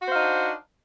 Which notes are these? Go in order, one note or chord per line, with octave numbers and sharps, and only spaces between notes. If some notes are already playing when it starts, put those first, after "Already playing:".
D4 D#4 F#4 C5 F5